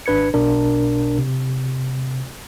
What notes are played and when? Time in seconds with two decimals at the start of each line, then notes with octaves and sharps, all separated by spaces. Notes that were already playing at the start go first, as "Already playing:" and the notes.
0.06 G#1 D4 B4 G#6 C#7
0.34 B1 B2 D4 A#4
1.19 C3